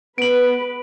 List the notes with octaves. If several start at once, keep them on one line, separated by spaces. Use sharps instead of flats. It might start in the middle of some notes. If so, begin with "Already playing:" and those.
B3 B4 D7 F#7